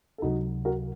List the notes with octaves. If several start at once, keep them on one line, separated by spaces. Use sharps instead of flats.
A4
C#2 C3 F#3 D#4 F#4
F#4 A#4